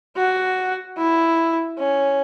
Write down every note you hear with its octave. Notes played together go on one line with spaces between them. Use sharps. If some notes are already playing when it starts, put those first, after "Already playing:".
F#4
E4
C#4